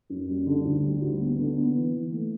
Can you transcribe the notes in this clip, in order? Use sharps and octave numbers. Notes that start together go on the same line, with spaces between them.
F#2
G3
D3
D2
G3
D2
B3
D3
B3
E3
E3
A3